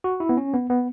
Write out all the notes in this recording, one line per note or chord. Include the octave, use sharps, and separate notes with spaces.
F#4
E4
B3
C#4
B3
B3